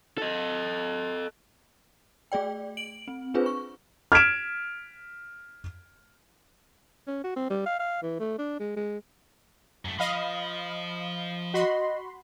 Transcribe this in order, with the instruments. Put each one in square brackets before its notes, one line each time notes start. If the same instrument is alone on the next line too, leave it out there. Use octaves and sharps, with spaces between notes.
[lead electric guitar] A4 D#5
[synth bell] A3 G#4 D5 G5
D7 F#7
C4
C4 D4 F4 G#4 B4 C5
C#6
[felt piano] F6 G#6 B6 D7 E7
[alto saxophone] C#4
F#4
C4
G3
F5
F5
E3
A3
D4
G#3
G#3
[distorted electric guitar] F#2 A3
[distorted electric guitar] F3 [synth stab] D#5 F5 B5
[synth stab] F#4 B5 C6 [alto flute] D#5